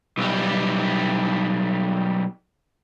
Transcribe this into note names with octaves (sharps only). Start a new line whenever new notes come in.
B1 G3